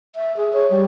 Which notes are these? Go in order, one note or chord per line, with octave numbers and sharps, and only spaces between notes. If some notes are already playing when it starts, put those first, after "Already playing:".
E5
G#4
C#5
G3